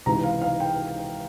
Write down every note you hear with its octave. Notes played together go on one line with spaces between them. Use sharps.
C#2 C3 E3 A#5
F5
F5
G5